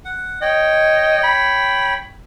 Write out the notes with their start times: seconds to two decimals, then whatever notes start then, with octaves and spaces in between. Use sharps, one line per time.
0.05 F#5
0.42 C#5 D#5 G5
1.23 B5